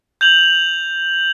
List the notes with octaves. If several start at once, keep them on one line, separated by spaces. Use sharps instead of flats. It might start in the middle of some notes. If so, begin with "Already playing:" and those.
G6 F7 F#7